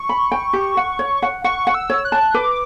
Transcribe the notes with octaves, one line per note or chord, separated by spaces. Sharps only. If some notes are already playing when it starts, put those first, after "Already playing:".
Already playing: C#6
B5
G5
G4
F#5
C#5
F#5
F#5 C#6
F#5
E6
C#5
F#6
A5
B4 D6